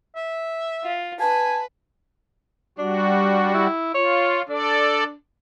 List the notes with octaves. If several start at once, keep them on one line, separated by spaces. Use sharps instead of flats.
E5
F4
B4 G#5 A5
G3 D4 F#4
E4
F4 C#5
D4 A4 D5